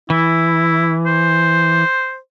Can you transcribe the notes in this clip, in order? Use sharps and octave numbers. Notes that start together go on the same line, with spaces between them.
E3 E4
C5